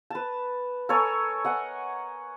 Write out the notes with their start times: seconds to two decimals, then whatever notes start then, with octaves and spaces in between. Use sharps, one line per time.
0.10 B4 A5
0.89 A4 A#4 C#5 G#5
1.45 D#5 F#5 G#5